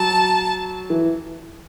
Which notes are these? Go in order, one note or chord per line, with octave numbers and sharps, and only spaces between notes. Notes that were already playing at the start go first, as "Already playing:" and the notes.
Already playing: F#3 A5
E3